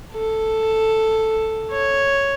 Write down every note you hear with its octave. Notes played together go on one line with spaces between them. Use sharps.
A4
C#5